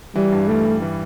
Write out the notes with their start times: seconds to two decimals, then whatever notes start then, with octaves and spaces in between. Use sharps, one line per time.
0.16 E3 G3
0.32 G2
0.48 G3 A3
0.65 G3
0.82 E3